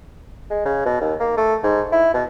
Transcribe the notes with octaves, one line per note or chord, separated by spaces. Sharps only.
G#3
C#3
B2
D#2
A#3
A3
G#2
E4
B2